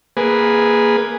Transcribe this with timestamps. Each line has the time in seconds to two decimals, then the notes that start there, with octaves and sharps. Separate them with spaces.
0.17 A#3 G#4 B4